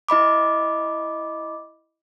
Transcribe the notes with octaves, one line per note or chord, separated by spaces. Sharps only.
E4 D#5 B5 D6